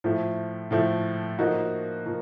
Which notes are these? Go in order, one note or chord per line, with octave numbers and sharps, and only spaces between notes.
A2 F3 A3
A2 F3 A3
F3 A#3 D#4 F#4
F3 A#3